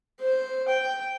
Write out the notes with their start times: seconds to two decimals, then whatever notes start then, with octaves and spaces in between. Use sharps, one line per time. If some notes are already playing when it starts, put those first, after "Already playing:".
0.21 C5
0.68 G5